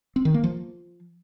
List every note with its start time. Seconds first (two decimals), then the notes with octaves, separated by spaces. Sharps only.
0.16 C4
0.25 D#3
0.34 A#3
0.44 F3